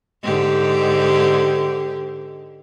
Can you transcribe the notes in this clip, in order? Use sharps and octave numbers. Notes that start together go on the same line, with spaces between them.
G#2 D3 G4